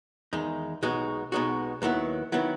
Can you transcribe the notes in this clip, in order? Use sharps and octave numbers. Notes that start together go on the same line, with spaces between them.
E2 D#3 G#3 D#4
B1 B2 G#3 D#4 F#4
B1 B2 G#3 D#4 F#4
D#2 D#3 F#3 B3 E4
D#3 F#3 B3 E4